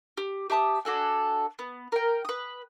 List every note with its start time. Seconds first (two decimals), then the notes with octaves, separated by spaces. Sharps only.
0.17 G4
0.50 G4 E5 A5 D#6
0.85 D4 F#4 A4 G#5
1.59 B3
1.92 A#4 G5
2.25 B4 D#6